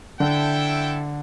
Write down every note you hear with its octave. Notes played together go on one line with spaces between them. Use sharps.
D3 E4 A4 E5 G5